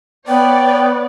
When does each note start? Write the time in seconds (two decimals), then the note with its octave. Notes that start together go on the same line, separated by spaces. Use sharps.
0.28 B3 B4 C#5 D5 G5